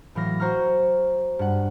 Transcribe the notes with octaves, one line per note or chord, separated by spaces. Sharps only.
A2 E3 F#3 F5 A#6
F#4 C5 A#5 C#6 F6
G2 F#5